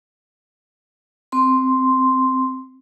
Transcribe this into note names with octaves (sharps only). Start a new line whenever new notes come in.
C4 C6